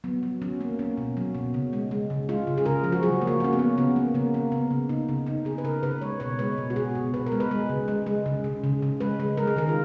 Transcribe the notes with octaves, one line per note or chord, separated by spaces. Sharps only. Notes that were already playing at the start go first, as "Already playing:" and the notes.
F#3 B3
F#3
F#3 C#4
A#3
A#3 C#4
B2
F#3
B2
C#3
G#3
G#3
C#3
G#3 F4
C#3
G#4
C#3 A#4
F3
F#4
F#3 G#4
A#3
F#4
A#3 C#4
B3
A#3
C#3 B3
A#3
C#3 A#3
A#3
C#3 B3
C#3
C#3 D#4
C#3
C#3 D#4
C#3 G#4
B4
C#3 A#4
C#3 B4
G#3 C#5
B2 C#5
G#3 B4
B2
F#4
B2 G#4
B2
B2 B4
A#4
G#3
B4
G#3
C#3
G#3
G#3
C#3
C#3
C#3
C#3
G#3 B4
G#3
G#3 A#4
G#4
D#3 A#4
F4